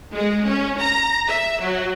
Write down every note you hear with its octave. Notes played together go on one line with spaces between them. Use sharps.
G#3
C#4
A#5
E5
F#3